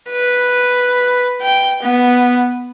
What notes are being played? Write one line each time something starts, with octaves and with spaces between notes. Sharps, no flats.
B4
G5
B3